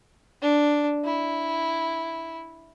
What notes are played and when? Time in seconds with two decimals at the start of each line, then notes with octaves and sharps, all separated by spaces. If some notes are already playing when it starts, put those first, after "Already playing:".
0.42 D4
1.04 E4